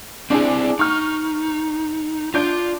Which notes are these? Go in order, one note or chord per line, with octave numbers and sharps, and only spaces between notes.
C4 D4 E4 G#4 D5
D#4 C#6 F6
D4 F4 G6 D7